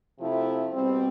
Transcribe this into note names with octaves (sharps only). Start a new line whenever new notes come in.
C3 F3 A3 E4
B2 G3 C4